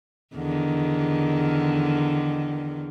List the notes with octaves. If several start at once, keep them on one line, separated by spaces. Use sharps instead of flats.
E2 D3 D#3